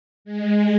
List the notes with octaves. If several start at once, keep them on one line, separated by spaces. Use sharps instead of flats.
G#3